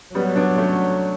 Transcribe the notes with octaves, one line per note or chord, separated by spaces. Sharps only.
F#3 G3 B3
B3 D4
A3 C#4